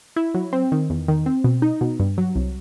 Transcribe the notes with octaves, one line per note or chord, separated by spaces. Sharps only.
E4
F#3
C4
D#3
E2
D#3
C4
B2
D#4
B2
G2
F#3
C2